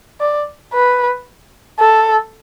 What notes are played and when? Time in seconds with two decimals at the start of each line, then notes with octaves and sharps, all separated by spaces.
0.21 D5
0.74 B4
1.80 A4